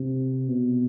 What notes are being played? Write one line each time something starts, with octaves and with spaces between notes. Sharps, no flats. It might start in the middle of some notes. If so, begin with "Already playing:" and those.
Already playing: C3
B2